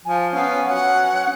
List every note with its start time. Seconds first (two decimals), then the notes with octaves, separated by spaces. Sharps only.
0.05 F3 G#5
0.33 B3 C#4 F5
0.67 F#3 F#5